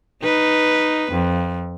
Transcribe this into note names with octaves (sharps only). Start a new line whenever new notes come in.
D#4 B4
F2